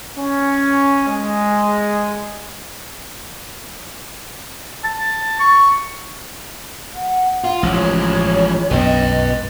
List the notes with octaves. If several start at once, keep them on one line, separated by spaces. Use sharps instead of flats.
C#4
G#3
A5
C#6
F#5
F4
A1 F3 G#3 C#5
B1 F#2 B3 B4 D#5 G5